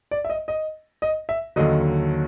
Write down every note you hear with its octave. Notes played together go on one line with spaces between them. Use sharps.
D5
E5
D#5
D#5
D#5
E5
D#2 D3 F#3 D#5